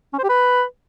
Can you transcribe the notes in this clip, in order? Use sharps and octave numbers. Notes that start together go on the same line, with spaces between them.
C#4
C5
G4
B4